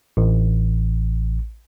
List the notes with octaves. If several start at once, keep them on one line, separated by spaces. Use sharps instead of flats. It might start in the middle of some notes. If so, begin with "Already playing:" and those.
A1